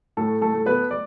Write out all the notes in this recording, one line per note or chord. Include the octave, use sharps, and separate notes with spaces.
A2 A3 A4
A3 A4
A3
B3 B4
D5